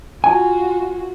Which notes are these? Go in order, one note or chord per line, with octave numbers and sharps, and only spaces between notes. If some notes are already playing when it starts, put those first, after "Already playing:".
F4 F#4 G#5